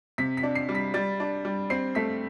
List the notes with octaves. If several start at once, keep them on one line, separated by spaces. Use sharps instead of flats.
C3 B6
B6
D4
C7
G3
B6
G3 A6
D4
G3
C4 C7
A3 B6